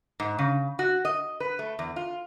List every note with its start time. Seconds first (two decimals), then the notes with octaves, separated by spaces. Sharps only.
0.20 G#2
0.39 C#3
0.79 F#4
1.05 D#5
1.40 B4
1.59 A3
1.79 E2
1.96 F4